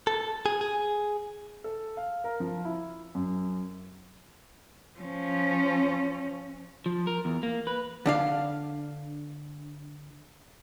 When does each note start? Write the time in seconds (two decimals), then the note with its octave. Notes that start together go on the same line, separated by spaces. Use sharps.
0.07 A4
0.46 G#4
0.61 G#4
1.64 A4
1.97 F5
2.24 A#4
2.40 F3
2.65 E4
3.15 F#2
5.00 F3 C#4
6.86 F3
7.07 A#4
7.25 E2
7.43 A#3
7.67 B4
8.06 D3 D4 F5